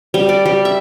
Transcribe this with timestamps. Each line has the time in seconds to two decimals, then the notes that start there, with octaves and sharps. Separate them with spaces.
0.14 G3
0.29 D5
0.45 G3
0.65 E5